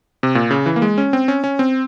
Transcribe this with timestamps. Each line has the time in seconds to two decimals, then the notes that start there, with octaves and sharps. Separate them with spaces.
0.23 C3
0.35 A#2
0.51 C#3
0.66 E3
0.76 A#3
0.82 G#3
0.98 C#4
1.13 C4
1.28 C#4
1.44 C#4
1.59 C4